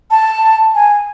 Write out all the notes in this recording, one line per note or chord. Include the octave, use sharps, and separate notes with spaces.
A5
G#5